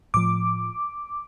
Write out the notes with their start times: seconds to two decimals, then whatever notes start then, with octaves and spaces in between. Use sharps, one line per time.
0.14 A2 F3 D6